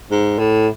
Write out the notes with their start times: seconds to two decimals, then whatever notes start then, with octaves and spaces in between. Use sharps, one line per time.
0.11 G#2
0.38 A2